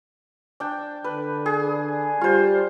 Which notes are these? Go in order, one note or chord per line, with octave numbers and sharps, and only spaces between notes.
D4 G5
D3 B4
G#4
G3 F4 C5